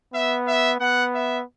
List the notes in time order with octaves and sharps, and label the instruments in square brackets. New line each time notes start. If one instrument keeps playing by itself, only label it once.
[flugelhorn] B3 [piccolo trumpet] E5
[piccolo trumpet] E5
[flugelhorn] B3 [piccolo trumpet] F#5
[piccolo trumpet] E5